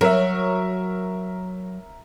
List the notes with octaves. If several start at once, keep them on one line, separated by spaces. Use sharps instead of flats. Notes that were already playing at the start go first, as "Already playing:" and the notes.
F#3 A#4 E5